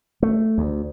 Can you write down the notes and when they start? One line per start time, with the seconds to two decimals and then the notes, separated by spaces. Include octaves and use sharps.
0.23 A3
0.58 D2